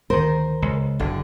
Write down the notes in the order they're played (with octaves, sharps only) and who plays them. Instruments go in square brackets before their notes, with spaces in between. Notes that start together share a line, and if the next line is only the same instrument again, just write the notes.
[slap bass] D2 D#3 [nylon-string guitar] A#4 C5
[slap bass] C#2
[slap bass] F#1 [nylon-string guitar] D3